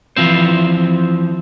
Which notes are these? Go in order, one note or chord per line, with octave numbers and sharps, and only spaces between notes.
E3 F3 C4 C5